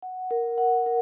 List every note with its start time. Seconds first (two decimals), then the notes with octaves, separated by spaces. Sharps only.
0.02 F#5
0.31 A#4
0.58 F#5
0.86 A#4